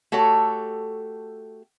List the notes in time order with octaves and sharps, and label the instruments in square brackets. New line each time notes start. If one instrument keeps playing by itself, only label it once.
[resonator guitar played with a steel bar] A3 F#4 G4 A4 C#5